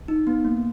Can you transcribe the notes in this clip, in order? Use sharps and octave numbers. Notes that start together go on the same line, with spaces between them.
D#4
B3
A#3